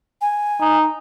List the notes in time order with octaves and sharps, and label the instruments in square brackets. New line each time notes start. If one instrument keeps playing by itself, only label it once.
[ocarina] G#5
[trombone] D#4